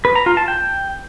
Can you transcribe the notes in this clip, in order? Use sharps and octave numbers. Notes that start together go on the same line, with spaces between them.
B4
A#5
F4
A5
G5